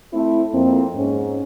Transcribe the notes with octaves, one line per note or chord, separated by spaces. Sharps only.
A3 C4 E4
F2 A#3 C4
G#2 C#4